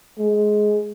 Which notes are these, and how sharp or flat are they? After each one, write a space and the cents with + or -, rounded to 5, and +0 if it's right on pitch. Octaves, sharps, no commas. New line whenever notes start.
G#3 +15